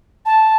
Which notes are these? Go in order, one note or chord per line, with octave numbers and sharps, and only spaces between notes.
A5